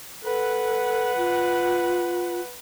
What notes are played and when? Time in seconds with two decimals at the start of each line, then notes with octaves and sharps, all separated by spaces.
0.23 A4 B4 F#5
1.17 F4